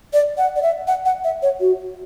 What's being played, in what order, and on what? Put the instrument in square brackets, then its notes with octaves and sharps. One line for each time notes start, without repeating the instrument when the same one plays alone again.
[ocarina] D5
F#5
D5
E5
F#5
F#5
E5
C#5
F#4